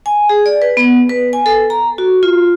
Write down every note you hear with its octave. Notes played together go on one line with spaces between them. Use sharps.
G#5
G#4
D5
B4
B3
B4
G#5
A4
A#5
F#4
F4